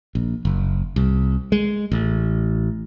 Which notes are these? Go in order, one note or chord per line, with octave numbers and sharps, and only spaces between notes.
A#1
F#1
C2
G#3
A1